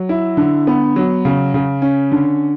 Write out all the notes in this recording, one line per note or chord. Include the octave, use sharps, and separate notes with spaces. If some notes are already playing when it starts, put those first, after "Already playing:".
Already playing: F#3
E4
D3
B3
F#3
C#3
C#3
C#4
D3